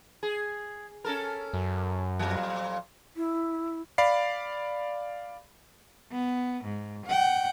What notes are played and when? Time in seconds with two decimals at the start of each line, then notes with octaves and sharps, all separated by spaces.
0.23 G#4
1.05 C#4 A4 A#4
1.54 F#2
2.19 F2 A#2 F#3
3.16 E4
3.98 D5 F5 B5 C7
6.12 B3
6.64 G#2
7.06 F#5 G5